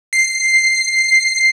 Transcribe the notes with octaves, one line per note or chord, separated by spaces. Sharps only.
C7